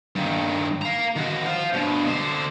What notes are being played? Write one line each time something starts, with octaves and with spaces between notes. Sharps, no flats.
G2 D#3
F5 A#5
D#3 F#4
C5 F5
G2 B2
D3 C5